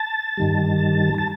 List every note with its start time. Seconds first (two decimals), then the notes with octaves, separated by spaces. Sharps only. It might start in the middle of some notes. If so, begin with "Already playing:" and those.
Already playing: A5
0.37 G2 D#3 G3
1.18 A5